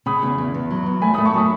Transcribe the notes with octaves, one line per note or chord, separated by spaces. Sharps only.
C#3 B5 D#6
E2
E2
E2
F#3
E2
A3 G#5 B5
B5 D#6
A3
A5 C#6
F#3 B5 D#6